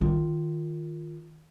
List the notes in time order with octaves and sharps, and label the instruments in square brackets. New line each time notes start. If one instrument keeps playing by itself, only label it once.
[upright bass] D#3 F4